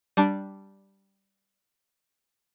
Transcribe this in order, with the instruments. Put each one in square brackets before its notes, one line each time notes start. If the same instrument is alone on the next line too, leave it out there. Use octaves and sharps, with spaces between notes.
[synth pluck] G3 D4